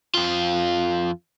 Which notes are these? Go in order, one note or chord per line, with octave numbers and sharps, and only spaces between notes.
F2 F4